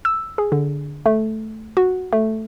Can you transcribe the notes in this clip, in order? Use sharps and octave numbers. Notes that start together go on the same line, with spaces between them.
E6
G#4
D3
A3
F#4
A3